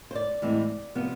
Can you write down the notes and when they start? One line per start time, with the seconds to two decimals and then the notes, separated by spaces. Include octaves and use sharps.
0.11 C5
0.15 D5
0.42 A2 E3 G#3 C4
0.95 C3 F3 B3